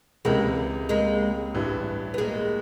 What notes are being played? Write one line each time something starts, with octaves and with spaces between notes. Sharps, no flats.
C#2 C3 E3 G#3 A#3
G#3 A#3
A1 G2 E3
B3
G#3 A#3